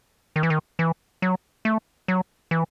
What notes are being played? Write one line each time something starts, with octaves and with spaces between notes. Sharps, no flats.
D#3
E3
D#3
E3
F#3
A3
F#3
E3